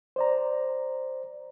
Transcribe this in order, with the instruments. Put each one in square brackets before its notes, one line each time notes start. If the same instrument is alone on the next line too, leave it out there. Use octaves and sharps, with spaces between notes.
[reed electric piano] C5 D5 A#5